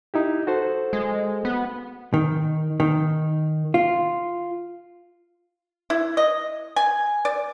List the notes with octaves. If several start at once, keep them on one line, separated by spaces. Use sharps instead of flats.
D#4 E4 G4
F#4 A4 C5
G#3
B3
D#3
D#3
F4
E4
D#5
G#5
D5